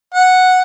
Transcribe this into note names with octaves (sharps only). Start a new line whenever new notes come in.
F#5